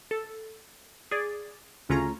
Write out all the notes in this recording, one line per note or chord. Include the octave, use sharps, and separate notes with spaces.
A4
G#4 D5
D2 C#3 A3 C#4 F4 A#5